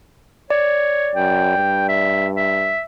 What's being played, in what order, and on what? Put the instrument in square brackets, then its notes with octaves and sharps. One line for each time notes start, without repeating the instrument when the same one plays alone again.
[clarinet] C#5 [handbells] D5
[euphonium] F#2 [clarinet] G5
[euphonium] G2
[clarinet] E5
E5